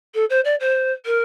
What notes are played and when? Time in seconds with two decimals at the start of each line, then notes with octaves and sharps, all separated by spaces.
0.14 A4
0.30 C5
0.45 D5
0.60 C5
1.06 A#4